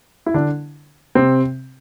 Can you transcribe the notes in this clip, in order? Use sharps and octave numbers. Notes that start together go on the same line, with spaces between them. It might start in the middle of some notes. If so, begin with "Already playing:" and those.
E4
D3 D4
C3 C4